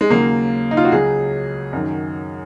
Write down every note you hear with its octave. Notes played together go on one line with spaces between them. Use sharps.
G#3
D#2 C#3 F#3 A#3
D#4
F4
F#4
C#2 C#3 F#3 G#4
F#2 D#3 F#3